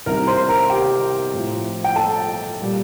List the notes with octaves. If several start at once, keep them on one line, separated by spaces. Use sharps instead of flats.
C2 C3 D#3 A#4 A#5
C5 C6
A#4 A#5
G4 G5
A2 F3
G5
A4 A5
A#2 G3